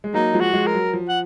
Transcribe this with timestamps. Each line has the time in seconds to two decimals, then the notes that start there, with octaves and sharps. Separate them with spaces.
0.04 G#3
0.14 F#3 A#3 D#4
0.34 F3 G#3
0.40 F#4
0.53 F3 G#3
0.67 A#4
0.73 F#3
0.93 F3
1.08 F#5